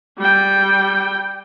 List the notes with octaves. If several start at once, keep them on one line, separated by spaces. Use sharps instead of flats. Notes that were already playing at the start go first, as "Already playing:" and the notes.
G3 G5